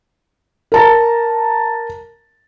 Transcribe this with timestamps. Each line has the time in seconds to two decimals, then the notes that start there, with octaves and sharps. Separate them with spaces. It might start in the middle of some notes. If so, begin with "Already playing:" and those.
0.72 A#4 A5 A#5